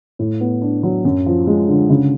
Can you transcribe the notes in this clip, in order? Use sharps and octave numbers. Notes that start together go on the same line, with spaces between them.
A2
B3
D4
F#3
F#2
F3
G#3
D3
C#3